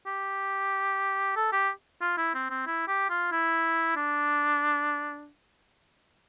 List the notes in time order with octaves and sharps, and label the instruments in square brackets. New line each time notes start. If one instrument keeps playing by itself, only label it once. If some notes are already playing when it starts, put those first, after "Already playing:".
[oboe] G4
A4
G4
F4
E4
C4
C4
E4
G4
F4
E4
D4